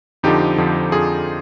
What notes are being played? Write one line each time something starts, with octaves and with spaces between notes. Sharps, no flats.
F2 D3 F3 D#4 G4
F2 D3 F3
F2 D3 F3 F4 G#4